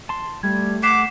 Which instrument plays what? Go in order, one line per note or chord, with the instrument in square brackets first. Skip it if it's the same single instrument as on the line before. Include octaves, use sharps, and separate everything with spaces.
[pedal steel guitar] A5 C6
[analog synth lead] G3 [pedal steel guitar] A3 [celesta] G#6
[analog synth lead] F#5 [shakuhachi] D6 [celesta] B6 C7 E7